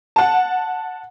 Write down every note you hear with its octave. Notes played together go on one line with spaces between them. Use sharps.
F#5 A5